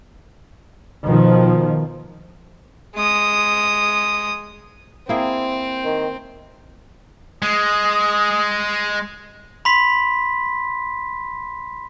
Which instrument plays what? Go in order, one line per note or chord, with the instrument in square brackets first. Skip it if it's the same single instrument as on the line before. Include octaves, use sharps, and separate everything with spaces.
[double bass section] B2 D#3 F3
[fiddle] G#3 D#6
[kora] A#3 E4 G#4 [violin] C4
[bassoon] D#3
[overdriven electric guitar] G#3 [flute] D#6
[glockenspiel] B5 C6 B6